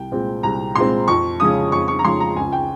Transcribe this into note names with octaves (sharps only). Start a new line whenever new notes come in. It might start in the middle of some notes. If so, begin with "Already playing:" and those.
Already playing: C2 G5
A#2 G#3 C4
C2 A#5
A#2 G#3 C4 C6
F2 C#6
C#3 F3 G#3 C#4 D#6
F2 C#6
C#6
A#5
C#3 F3 G#3 C#4 C6
A#5
C#2 G#5
G5